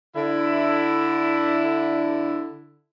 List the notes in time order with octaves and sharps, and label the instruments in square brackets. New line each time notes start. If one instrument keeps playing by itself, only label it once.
[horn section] D3 E4